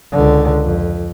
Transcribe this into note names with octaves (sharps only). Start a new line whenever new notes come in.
C#2 D3
F2